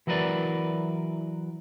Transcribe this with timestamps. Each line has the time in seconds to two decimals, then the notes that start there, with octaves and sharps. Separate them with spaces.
0.07 E3 F#3 A#4 B4 D5